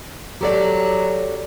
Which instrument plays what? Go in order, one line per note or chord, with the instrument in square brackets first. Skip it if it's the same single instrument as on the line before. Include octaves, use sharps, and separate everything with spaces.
[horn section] F#3 [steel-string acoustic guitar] G4 A4 D5